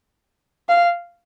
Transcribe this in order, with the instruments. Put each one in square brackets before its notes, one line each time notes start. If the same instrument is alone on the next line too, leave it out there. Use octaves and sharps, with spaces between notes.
[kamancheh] F5